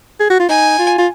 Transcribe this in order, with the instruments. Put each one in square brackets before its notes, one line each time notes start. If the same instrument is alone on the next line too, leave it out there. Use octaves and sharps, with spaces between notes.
[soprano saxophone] G#4
F#4
F4
[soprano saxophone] D#4 [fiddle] G#5
[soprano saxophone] F4
F4